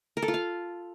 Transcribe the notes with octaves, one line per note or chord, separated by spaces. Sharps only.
A#4
A4
F4
F5